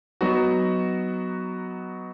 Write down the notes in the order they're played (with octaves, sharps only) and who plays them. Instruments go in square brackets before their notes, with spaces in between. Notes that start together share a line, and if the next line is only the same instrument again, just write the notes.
[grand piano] F#3 B3 D#4 F#4